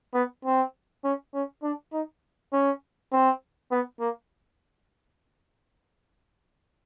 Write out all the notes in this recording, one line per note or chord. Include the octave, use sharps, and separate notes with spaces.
B3
C4
C#4
C#4
D4
D#4
C#4
C4
B3
A#3